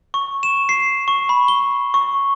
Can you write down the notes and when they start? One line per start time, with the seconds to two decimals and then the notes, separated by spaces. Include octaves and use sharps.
0.14 C#6
0.43 E7
0.69 C7
1.08 C#6
1.29 B5
1.48 G7
1.94 C#6